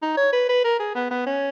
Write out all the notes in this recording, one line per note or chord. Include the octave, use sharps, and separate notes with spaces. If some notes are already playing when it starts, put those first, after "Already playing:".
D#4
C#5
B4
B4
A#4
G#4
B3
B3
C#4